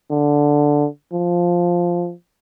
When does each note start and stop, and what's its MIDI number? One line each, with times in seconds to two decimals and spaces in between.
0.10 0.87 50
1.13 2.13 53